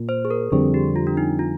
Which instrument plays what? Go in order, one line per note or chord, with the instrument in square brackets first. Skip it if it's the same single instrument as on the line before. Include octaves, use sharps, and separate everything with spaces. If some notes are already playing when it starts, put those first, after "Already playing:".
Already playing: [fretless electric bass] A#2
[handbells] C5
G#4
A#4
[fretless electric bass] F2 D3 G3 C4 [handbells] G#4
[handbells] G4
F4
D4
D#4
F4